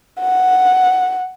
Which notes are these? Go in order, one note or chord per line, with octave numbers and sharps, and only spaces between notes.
F#5